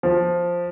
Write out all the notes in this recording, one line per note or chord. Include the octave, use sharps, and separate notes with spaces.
F3